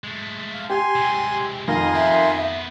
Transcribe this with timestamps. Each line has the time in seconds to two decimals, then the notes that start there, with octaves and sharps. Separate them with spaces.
0.04 G#3 A3
0.54 F5
0.70 G4 G#5 C6 G#6
0.95 C3 G#3
1.68 F2 D#3 D#5 F5 G#5 A#5 C6
1.95 B3 C5 E5